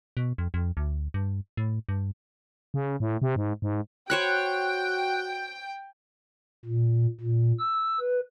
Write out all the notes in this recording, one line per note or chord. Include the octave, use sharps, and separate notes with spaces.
B2
F2
F2
D2
G2
A2
G2
C#3
A2
C3
G#2
G#2
F#4 C5 C#5 G5 B5 F#6
A#2
A#2
E6
B4